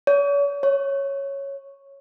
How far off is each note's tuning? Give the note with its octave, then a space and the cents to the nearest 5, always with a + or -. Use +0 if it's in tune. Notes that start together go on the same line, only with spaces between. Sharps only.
C#5 +40
C#5 -5